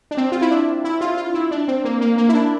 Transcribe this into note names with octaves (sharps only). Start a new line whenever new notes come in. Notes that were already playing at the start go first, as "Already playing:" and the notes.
D4
C4
F4
E4
D4
E4
F4
F4
E4
D4
C4
A#3
A#3
A#3
E4
D4